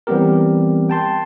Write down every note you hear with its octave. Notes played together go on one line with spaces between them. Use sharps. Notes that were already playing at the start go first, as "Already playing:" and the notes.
E3 G3 B3 C4 G4 A#4
G5 A5 C6